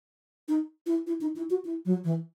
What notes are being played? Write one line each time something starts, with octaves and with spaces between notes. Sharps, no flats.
D#4
E4
E4
D#4
E4
F#4
E4
F#3
E3